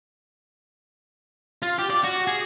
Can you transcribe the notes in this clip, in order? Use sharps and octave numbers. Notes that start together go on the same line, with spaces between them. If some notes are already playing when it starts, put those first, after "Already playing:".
F4
G4
D5
F#4
G#4